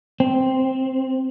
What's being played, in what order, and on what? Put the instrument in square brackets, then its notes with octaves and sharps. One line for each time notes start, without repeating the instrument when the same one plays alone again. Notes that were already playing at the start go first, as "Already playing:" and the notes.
[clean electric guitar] C4